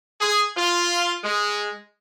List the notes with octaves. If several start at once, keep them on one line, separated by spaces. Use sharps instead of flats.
G#4
F4
G#3